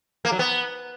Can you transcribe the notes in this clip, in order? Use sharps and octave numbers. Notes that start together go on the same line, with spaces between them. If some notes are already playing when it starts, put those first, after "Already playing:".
A#3
F#3
B3